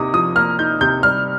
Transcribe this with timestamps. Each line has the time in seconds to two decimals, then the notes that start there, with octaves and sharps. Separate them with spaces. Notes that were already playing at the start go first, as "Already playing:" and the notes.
Already playing: C3 A#3 D#4 D6 D#6
0.13 F3 D#6
0.36 A#3 F6
0.59 D#4 G6
0.81 C3 G6
1.03 G3 F6